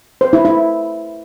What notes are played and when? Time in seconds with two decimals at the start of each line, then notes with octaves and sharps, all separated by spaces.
0.21 C5
0.33 E4
0.45 E4